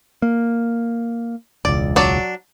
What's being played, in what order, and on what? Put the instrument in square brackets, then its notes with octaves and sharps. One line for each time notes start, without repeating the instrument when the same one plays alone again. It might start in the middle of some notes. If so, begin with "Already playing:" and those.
[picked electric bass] A#3
[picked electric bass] E1 C#2 [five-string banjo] D5
[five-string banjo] F#3 D4 D5